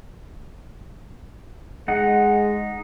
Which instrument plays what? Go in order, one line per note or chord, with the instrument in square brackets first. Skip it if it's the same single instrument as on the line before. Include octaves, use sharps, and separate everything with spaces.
[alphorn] G#3 [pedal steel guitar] D#4 F#5